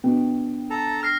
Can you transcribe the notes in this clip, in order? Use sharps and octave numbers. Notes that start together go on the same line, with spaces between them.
B2 D4 G5
A4 A5 A#5
F6 A#6 C7